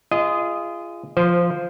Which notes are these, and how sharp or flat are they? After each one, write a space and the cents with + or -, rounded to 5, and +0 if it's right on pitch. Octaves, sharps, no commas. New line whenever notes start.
F4 -30 G#4 -10 D#5 +0
F3 +0 C5 -15